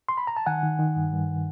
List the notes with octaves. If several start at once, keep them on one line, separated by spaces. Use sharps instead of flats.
C6
B5
A#5
A5
D#3 F#5 G#5
D#3
D#3
G2
G2